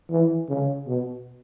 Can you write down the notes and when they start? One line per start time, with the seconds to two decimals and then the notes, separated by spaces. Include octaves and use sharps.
0.10 E3
0.49 C#3
0.87 B2